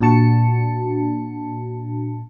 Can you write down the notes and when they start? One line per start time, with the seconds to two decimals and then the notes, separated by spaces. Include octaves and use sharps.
0.01 A#2 D4 F#4 A5 C#7